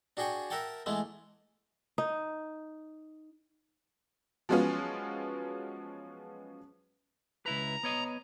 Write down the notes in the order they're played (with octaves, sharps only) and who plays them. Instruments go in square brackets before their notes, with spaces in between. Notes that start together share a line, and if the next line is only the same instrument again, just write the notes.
[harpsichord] D4 F#4 G#4 G5 G#5 C#6
A#4 E5 F#5 G5 A5
E3 G#3 A3 B3
[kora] D#4
[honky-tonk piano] F3 F#3 G#3 B3 C#4 F4
[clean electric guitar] C#2 E4 B4 [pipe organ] A#5
[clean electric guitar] B3 C#5 D#5